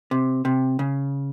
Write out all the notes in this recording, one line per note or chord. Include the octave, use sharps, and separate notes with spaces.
C3
C3
C#3